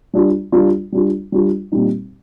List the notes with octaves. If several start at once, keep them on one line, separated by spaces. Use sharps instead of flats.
G3 D4 F4
G3 D4 F4
G3 D4 F4
G3 D4 F4
A#2 G3 C4 D#4